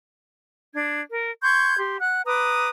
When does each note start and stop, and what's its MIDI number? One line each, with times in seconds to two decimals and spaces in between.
0.73 1.00 62
0.73 1.00 92
1.10 1.30 70
1.42 1.76 84
1.42 1.76 85
1.42 1.76 91
1.42 1.76 92
1.77 1.97 67
1.77 1.97 84
2.00 2.22 78
2.00 2.22 90
2.26 2.69 71
2.26 2.69 82
2.26 2.69 86
2.26 2.69 87